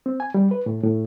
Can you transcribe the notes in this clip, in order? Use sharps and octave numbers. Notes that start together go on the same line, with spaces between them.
C4
G#5
G3
B4
A2
A2